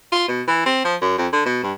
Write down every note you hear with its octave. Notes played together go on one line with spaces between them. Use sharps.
F4
B2
E3
C4
F3
F#2
F2
D3
B2
G2